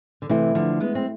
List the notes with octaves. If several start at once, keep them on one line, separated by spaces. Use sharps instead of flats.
D3
C3 E3 A3 E4 A4
D3 F3
G#3 B3
C4